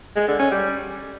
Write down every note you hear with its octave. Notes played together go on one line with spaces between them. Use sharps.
G#3
D3
C#4
G3